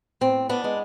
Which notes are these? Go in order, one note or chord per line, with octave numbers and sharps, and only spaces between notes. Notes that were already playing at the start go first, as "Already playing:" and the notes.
A2 C4
B3 D4
G#3 B3